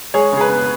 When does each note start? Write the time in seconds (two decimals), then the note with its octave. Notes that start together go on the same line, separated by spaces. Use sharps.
0.14 G#3 G#4 C#5
0.32 C#3
0.37 G#4
0.41 B4
0.50 B3